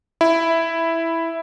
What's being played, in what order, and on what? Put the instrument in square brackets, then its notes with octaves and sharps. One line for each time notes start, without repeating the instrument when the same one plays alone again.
[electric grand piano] E4